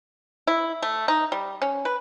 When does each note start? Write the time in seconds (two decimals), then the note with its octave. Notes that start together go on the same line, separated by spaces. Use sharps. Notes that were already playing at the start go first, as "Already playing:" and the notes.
0.47 E4
0.82 A3
1.08 D#4
1.32 G3
1.62 C#4
1.85 B4